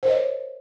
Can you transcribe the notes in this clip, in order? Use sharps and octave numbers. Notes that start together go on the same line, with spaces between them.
A#4 C5 C#5 D#5